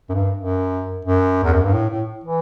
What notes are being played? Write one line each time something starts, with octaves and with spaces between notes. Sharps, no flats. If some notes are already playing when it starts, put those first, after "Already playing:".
F#2
G2
F#2
F#2
E2
F#2
G2
A2
A2
E3